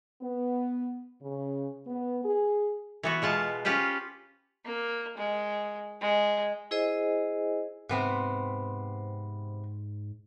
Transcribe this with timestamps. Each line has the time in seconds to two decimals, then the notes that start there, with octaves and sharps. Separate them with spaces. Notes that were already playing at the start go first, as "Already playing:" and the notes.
0.22 B3
1.22 C#3
1.87 B3
2.25 G#4
3.03 E3 B3 F#4
3.22 B2 G#3 F4 A5
3.65 C#4 F4 G4 B4 C5
4.66 A#3
5.18 G#3
6.02 G#3
6.71 E4 G#4 C5 D#5 G#5
7.89 G#2 C3 B3 C4